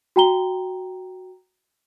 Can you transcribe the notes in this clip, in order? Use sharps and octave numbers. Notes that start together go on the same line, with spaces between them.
F#4 G5 A#5 G7